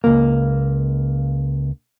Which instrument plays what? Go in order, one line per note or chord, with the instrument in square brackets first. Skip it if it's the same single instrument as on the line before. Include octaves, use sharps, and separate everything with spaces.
[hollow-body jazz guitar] C#2 A#3